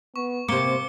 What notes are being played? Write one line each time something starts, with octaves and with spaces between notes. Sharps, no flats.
B3 C#6
C3 A#3 C4 D6 C#7 G7